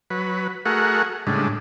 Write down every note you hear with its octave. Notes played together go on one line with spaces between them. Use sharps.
F#3 B4
A3 F#4 G#4 A#4 F#5
A2 C#3 G3 G#3 D4